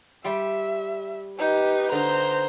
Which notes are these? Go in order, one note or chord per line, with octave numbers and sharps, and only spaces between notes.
G3 E5 G5 C6
D#4 G4 B4
D3 D#4 C5 A#5